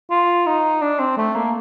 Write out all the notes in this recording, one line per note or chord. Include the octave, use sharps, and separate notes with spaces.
F4
D#4
D4
C4
A3
A#3